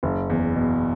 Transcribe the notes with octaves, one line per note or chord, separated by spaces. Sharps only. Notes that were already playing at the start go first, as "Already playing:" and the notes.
F#1
E2
B2